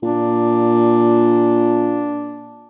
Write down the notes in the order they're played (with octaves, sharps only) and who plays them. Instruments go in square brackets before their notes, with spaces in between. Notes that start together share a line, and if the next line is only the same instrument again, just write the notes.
[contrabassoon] A#2 [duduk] D4